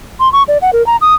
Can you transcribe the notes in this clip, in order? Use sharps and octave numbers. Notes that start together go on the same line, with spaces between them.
C6
C#6
D5
F#5
A#4
A#5
D#6